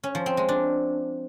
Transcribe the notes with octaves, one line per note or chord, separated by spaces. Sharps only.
C#4
F3
C4
G#3
D4